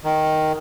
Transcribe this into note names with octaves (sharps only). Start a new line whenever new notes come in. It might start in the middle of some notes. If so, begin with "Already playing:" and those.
D#3